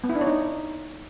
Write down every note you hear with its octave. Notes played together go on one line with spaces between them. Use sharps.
B3
E4
D4
C#5
D#4